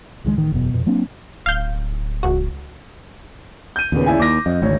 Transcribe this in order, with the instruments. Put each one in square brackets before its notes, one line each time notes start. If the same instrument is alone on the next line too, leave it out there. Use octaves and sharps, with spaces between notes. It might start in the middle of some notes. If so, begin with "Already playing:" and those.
[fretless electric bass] C#2 D#3 G3 G#3
A1 D#3
E1 F#2 B2
F2 B2
F#3 A#3 C4 D4
[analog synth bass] D1 [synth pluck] F5 G6
[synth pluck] C#2 F#4
[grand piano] G6 D#7
[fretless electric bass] D#2 C#3 [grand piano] A#2 B3
[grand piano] E4 D5 G#5
[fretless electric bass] D#2 [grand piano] D6 A#6
[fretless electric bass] F2 [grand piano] D#5
[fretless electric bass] G#1 [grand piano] D2 C#5